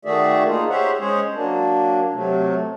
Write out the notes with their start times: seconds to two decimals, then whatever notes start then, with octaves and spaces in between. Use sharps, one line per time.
0.05 D#3 A3 F#4 G#4 D5 E5
0.47 A#3 D#4 F4 G#4
0.70 G4 G#4 C5 C#5 E5 F#5
0.99 G#3 C#4 G#4 C5 C#5
1.34 F#3 A#3 D4
2.14 C3 F#3 A3